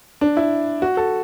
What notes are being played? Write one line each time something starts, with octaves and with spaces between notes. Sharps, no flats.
D4
E4
F#4
A4